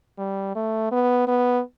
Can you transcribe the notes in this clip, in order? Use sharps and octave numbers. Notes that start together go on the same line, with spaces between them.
G3
A3
B3
B3